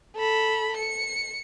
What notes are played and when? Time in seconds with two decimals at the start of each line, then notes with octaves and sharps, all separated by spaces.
0.17 A4 B5
0.77 C#7